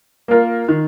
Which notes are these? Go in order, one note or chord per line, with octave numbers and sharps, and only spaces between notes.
A#3 F4 A#4
D#3